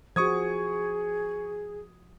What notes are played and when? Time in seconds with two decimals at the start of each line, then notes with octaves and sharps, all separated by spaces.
0.16 F3 F#4 G#4 C#6 D#6 G#6